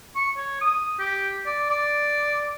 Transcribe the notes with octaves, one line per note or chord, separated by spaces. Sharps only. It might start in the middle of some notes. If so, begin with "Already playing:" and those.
C#6
C#5
D#6
G4
D5
D5